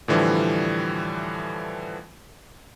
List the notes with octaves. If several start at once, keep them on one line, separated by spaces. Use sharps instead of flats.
A2 D3 E3 F3 G3